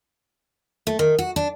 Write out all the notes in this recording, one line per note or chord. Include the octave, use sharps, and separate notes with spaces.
A3
D#3
F#4
D4